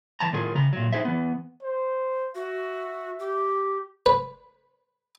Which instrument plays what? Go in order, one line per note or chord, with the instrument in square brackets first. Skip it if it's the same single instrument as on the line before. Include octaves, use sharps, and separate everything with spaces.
[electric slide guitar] E3 A5 A#5
A2 D#3 F#3 F4 G#4 A#4
C#3 A#5
A#2 F#3
D#4 G#4 C5 E5
E3 B3
[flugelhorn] C5
[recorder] F#4 [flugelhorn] E5
[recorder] G4
[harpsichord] B4